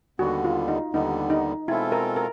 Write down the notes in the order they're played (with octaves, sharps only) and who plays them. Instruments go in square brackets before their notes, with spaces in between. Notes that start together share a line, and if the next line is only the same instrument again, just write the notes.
[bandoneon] D#2 D3 G3 B3 [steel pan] F#4
[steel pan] F4
D#4
[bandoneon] D#2 D3 G3 B3 [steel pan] D#4
[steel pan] D#4
[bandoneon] B2 G#3 C4 F4 A4 [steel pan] E4
[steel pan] A#4
A#4